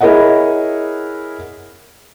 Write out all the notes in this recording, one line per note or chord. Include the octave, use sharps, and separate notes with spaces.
E4 G#4 A#4 C#5 D#5 F#5